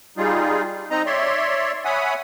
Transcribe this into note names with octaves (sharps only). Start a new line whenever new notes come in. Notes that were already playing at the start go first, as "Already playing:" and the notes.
G3 D#4 F4 G#4
C4 D#4 D#5 A#5
C#5 D5 E5 C6
C#5 E5 F#5 G#5 B5 D#6